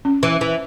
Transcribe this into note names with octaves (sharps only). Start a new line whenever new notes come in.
C#4
E3
E3